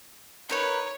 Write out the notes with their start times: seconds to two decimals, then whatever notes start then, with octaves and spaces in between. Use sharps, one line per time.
0.49 D#4 A#4 B4 C#5